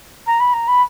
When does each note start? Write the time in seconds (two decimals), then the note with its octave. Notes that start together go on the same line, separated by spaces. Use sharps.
0.26 A#5
0.40 B5
0.53 A#5
0.67 B5